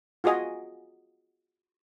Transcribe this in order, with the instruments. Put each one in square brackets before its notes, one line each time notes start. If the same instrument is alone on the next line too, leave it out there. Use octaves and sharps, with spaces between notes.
[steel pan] F4 F#4 G#4 D#5 G#5